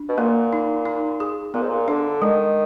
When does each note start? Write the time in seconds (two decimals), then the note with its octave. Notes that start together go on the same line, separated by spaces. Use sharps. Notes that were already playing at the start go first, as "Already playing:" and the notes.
Already playing: D4
0.09 B2
0.18 A#2 A#3
0.53 D#4
0.85 D#4
1.20 G#4
1.54 A#2 B3
1.62 G#2
1.70 A#2
1.88 D3 D4
2.22 D#3 G#3